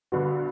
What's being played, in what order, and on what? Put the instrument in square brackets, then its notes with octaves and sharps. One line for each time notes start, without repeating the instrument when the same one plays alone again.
[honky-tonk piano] G1 G2 D3 G3 B3 [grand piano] F#4